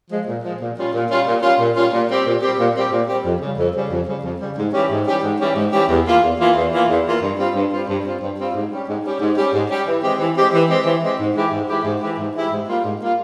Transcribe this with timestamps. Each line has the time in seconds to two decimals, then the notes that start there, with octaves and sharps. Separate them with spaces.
0.10 F3 G#3
0.27 A#2
0.43 F3 G#3
0.60 A#2
0.77 G3 C#4 F4
0.93 A#2
1.10 G3 C#4 F4
1.26 A#2
1.43 G3 C#4 F4
1.60 A#2
1.76 G3 C#4 F4
1.93 A#2
2.09 G3 C4 G4
2.26 A#2
2.42 G3 C4 G4
2.58 A#2
2.76 G3 C4 G4
2.92 A#2
3.08 G3 C4 G4
3.25 F2
3.41 C#3 G3
3.58 F2
3.75 C#3 G3
3.91 F2
4.08 C#3 G3
4.23 F2
4.41 C#3 G3
4.57 G#2
4.74 E3 G3 C#4 G4
4.91 G#2
5.07 E3 G3 C#4 G4
5.23 G#2
5.40 E3 G3 C#4 G4
5.56 G#2
5.73 E3 G3 C#4 G4
5.89 E2
6.06 E3 A#3 F4
6.22 E2
6.39 E3 A#3 F4
6.56 E2
6.72 E3 A#3 F4
6.88 E2
7.05 E3 A#3 F4
7.22 G2
7.38 G3 C4 F4
7.54 G2
7.71 G3 C4 F4
7.88 G2
8.04 G3 C4 F4
8.21 G2
8.38 G3 C4 F4
8.55 G#2
8.71 G3 C#4 G4
8.87 G#2
9.04 G3 C#4 G4
9.20 G#2
9.37 G3 C#4 G4
9.53 G#2
9.70 G3 C#4 G4
9.87 E3
10.03 G#3 C4 G4
10.19 E3
10.36 G#3 C4 G4
10.53 E3
10.69 G#3 C4 G4
10.85 E3
11.02 G#3 C4 G4
11.19 G#2
11.35 E3 G#3 E4 G4
11.52 G#2
11.68 E3 G#3 E4 G4
11.85 G#2
12.01 E3 G#3 E4 G4
12.18 G#2
12.35 E3 G#3 E4 G4
12.51 G#2
12.68 G3 A#3 F4
12.84 G#2
13.01 G3 A#3 F4